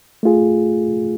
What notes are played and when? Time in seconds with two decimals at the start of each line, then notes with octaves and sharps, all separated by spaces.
0.23 A3 F4 G#4